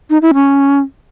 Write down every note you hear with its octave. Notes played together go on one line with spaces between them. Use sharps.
D#4
E4
C#4